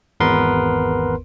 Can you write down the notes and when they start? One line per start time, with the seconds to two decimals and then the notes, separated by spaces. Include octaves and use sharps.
0.20 G#1 E2 B3 A#4 B4 C6